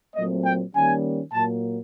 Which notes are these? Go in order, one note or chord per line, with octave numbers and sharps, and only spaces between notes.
A#2 F#3 A3 C4 D#5
G5
D#3 G3 A#3 C#4 G#5
A#2 F#3 A#3 A5